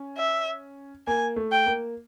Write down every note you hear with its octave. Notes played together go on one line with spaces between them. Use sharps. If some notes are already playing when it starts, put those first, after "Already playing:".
Already playing: C#4
E5
A#3 G#5
A3
G5
A#3